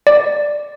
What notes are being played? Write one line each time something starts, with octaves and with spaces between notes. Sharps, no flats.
D5